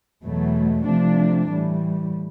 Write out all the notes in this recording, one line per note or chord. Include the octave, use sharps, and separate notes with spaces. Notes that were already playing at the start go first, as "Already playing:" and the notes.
E2 B2 F#3 A3
C3 F3 A3 D4
A2 E3 G3